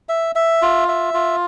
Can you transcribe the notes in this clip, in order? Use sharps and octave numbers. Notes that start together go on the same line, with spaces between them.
E5
E5
F4
E5
F4